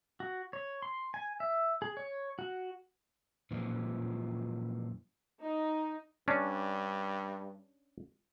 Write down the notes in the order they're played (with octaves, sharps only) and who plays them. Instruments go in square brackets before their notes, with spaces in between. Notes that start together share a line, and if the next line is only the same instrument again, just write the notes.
[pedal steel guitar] F#4
C#5
C6
G#5
E5
G#4
C#5
F#4
[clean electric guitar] F#2 A#2 E3 F3
[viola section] D#4
[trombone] G2 [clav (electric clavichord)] C#4 D4